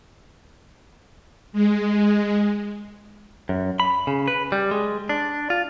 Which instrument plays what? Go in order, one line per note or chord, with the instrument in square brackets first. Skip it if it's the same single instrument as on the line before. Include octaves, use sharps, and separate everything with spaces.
[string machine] G#3
[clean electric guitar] F#2
B5
C#3
B4
G3
G#3
D4
F4